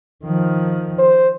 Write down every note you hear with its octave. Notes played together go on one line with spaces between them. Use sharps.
D#3 F3
C5